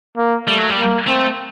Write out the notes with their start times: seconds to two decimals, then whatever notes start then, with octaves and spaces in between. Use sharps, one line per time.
0.17 A#3
0.47 G3 A3
0.58 F#3
0.70 G3
0.78 A#3
1.07 A3 C4